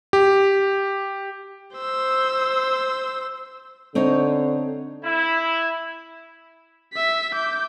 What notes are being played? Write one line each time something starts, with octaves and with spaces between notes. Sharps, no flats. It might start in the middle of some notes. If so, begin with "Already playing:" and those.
G4
C5 E6
D3 C4 D#4 C#5
E4
E5 B6
D6 G6